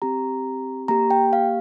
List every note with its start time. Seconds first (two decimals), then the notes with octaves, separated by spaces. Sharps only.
0.02 C4 G4 A#5
0.88 A#3 G4 A#5
1.11 G5
1.33 F5